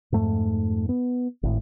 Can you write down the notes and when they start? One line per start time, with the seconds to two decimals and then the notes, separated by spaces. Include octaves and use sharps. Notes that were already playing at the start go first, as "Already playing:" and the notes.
0.12 F2 G#2 A3
0.89 B3
1.43 G#1 A2